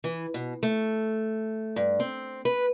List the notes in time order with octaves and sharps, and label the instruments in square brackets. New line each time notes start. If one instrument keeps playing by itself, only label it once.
[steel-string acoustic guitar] E3
B2
A3
G2
C4
B4